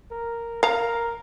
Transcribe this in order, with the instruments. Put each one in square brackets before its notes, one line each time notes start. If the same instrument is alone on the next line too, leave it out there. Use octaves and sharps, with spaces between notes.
[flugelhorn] A#4
[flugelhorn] A#4 [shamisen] F5 A#5